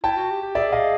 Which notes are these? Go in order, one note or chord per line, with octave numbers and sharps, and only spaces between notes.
E4 G5 A5
F#4
G4
G4
G#4 D5 E5
D#5 F5